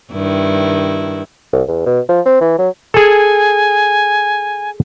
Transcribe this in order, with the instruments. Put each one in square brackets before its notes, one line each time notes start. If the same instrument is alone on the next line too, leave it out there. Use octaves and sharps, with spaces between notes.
[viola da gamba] G2 D#3 E4
[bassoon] C2
E2
B2
F3
C4
E3
F#3
[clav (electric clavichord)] G#4 A4 [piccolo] G#5